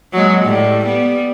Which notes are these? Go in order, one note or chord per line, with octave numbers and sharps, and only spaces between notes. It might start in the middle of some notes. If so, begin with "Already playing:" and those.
F#3 G#3
A2 G3
G3 B3